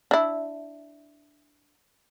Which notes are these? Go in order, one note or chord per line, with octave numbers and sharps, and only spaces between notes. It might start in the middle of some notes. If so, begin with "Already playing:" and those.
D4 E4